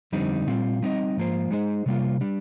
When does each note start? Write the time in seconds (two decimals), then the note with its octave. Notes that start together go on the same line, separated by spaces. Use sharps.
0.12 F2 D3 G3 C4 D#4
0.47 A#2 G3 C4 F4
0.83 G3 C4 D#4 A#4 D#5
1.17 G#2 F3 A#3 F4 C5
1.51 G#3 D#4 G#4 C5 D#5
1.86 C3 G3 A#3 F4
2.21 G3 D4